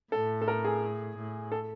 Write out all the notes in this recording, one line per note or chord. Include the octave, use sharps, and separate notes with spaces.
A2 A4
A4
A#4
G#4
A2
A4